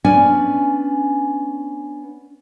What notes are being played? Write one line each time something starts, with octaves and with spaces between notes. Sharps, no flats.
B3 C#4 D4 G#5